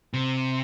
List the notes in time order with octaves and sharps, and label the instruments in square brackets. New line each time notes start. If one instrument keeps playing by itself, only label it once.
[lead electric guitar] C3